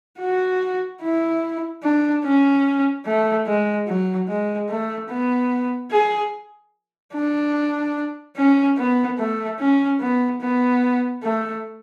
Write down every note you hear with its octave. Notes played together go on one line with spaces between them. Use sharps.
F#4
E4
D4
C#4
A3
G#3
F#3
G#3
A3
B3
G#4
D4
C#4
B3
A3
C#4
B3
B3
A3